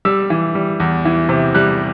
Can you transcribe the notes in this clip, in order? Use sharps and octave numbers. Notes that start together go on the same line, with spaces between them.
G3 E6
E3
G3
E2
E3
C3
G3 F#6